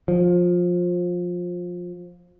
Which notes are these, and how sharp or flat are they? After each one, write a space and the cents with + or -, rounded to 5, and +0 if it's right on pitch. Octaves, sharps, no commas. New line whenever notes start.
F3 +20